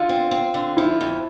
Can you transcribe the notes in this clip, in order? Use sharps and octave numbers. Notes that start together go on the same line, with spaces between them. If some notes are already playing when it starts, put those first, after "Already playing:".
Already playing: D3 F4
C4
C4
D3
F3 E4
F2